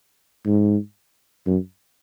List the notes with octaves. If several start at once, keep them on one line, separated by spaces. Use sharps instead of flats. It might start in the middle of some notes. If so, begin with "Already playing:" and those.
G#2
F#2